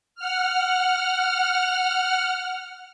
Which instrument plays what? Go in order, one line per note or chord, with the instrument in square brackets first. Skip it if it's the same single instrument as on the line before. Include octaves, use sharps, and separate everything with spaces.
[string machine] F#5 F6